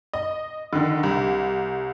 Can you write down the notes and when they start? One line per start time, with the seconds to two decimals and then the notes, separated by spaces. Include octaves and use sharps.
0.13 D#5
0.73 D3 D#3
1.03 C2